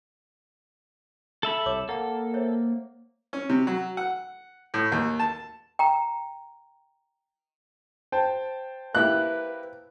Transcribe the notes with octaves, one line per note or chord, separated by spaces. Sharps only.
A4 E5 B5
C2 C#5 D6
A#3 A4 F#5 A#5
C5 C#5 E5
C#4
C3
F#3
F#5
A2
D#2
A5
G5 A#5
C5 G5 A5
A#3 E4 G4 B4 F#6